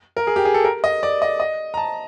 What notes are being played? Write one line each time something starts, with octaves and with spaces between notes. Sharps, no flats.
A#4
G#4
G4
G#4
A4
A#4
D#5
D5
D#5
D#5
A#5
A5